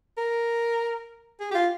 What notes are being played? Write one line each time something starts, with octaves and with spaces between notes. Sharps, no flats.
A#4
G#4
G4
F4